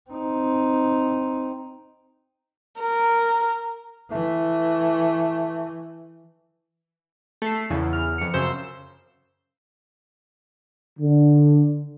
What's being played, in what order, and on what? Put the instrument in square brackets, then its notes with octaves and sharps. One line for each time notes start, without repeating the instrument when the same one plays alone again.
[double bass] C4 D#4
[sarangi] A#4
[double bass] E3 [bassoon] A3
[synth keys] A3 C7
E2 C#3
E2 F6
F2 C#7
F#2 C#3 C5 E6
[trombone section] D3